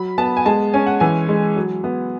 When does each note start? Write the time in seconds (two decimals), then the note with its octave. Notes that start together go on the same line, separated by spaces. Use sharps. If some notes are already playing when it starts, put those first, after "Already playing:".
Already playing: F#3 B5
0.18 B3 A5
0.37 G#5
0.46 G#3 A5
0.73 C#4 G#5
0.86 F#5
1.00 E3 G#5
1.29 G#3
1.56 F#3
1.84 B3